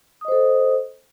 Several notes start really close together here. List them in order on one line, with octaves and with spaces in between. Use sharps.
D#6 D#5 C5 A4